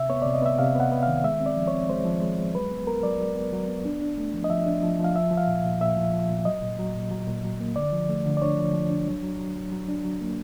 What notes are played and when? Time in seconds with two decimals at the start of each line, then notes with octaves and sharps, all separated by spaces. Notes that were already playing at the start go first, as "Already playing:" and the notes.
Already playing: C3 E5
0.10 B3 C#5
0.22 C3 D5
0.34 D#5
0.42 B3 E5
0.59 C3 F5
0.75 B3
0.80 F#5
0.92 B3
1.03 D#3 F5
1.24 G#3 E5
1.40 C4
1.46 D5
1.57 F3
1.67 C#5
1.73 C4
1.89 G#3 C5
2.05 F3
2.22 G#3
2.38 G#3
2.54 F#3 B4
2.71 B3
2.87 B3 A#4
3.03 F#3 D5
3.20 F#3
3.36 B3
3.52 F#3
3.69 B3
3.85 D4
4.02 D4
4.17 A3
4.33 F3
4.44 D#5
4.50 F3 E5
4.67 D4
4.83 F3
4.99 F3
5.04 F5
5.15 F3 E5
5.31 F3
5.37 F5
5.47 A#2
5.64 A#2
5.81 A#2 E5
5.97 F3
6.13 F3
6.30 A#2
6.45 F#3 D#5
6.62 A#2
6.79 F#3
6.95 A#2
7.11 F#3
7.27 A#2
7.44 F#3
7.60 A#3
7.76 D3 D5
7.92 F3
8.09 A3
8.25 D3
8.37 D5
8.42 D4 C#5
8.57 F3
8.74 F3
8.90 D4
9.07 F#3
9.23 F#3
9.39 F#3
9.56 F#3
9.73 F#3
9.88 D4
10.05 F#3
10.21 A#3